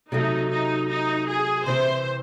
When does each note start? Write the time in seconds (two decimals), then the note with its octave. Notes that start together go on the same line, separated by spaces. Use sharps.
0.11 C3 F#3 A3 D#4
0.50 D#4
0.89 D#4
1.28 G#4
1.66 C3 E3 C4 C5